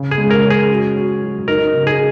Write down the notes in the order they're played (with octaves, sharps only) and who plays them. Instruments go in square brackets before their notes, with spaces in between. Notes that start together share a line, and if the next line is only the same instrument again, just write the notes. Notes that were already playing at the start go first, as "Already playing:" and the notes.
Already playing: [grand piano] C#3
[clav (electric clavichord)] G#4
[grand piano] G#3
[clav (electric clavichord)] A#4
[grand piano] C#4
[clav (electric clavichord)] G#4
[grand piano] F#4
F#4
F#3
[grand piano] D#4 [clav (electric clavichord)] A#4
[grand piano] C#3
[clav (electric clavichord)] G#4